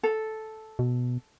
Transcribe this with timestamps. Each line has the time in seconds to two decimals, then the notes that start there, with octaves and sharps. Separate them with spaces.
0.03 A4
0.79 B2